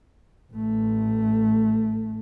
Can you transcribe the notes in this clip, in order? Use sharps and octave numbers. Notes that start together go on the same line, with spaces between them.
A1 A3